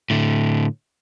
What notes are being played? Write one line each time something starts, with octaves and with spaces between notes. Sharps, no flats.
A2 D3